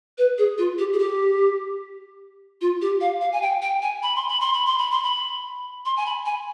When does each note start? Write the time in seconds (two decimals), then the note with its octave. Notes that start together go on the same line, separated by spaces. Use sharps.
0.18 B4
0.38 G#4
0.58 F4
0.78 G4
0.93 G#4
0.99 G4
2.61 F4
2.81 G4
3.01 F5
3.21 F5
3.32 G#5
3.42 G5
3.62 G5
3.82 G#5
4.03 B5
4.16 C6
4.28 B5
4.40 C6
4.53 B5
4.66 C6
4.78 B5
4.91 C6
5.03 B5
5.85 C6
5.97 G#5
6.06 B5
6.26 G#5